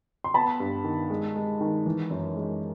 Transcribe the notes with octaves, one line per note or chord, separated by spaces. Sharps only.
C6
B3 A5 B5
G2
D#3
G#3
G#3
D#3
E3
F#2
G#3